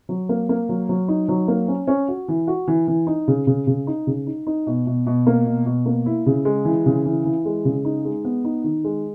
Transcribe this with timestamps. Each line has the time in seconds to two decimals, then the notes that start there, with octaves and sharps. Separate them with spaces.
0.09 F#3
0.29 A#3
0.49 A#3
0.69 F#3
0.89 F#3
1.08 D#4
1.29 F#3
1.48 A#3
1.68 C#4
1.87 C#4
2.08 F#4
2.28 E3
2.47 F#4
2.68 E3
2.88 E3
3.07 D#4
3.28 C#3
3.47 C#3
3.67 C#3
3.87 D#4
4.07 C#3
4.27 D#4
4.47 D#4
4.67 B2
4.87 B2
5.07 B2
5.26 A#3
5.46 B2
5.66 B2
5.86 A#3
6.06 E4
6.26 C#3
6.45 G#3
6.65 E3
6.86 C#3
7.05 E3
7.25 E3
7.45 G#3
7.65 C#3
7.85 D#4
8.05 G#3
8.25 B3
8.45 D#4
8.64 D#3
8.84 G#3